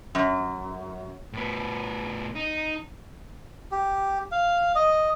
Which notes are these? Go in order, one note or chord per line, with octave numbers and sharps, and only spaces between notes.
F#2
A2 B3
D#4
G4
F5
D#5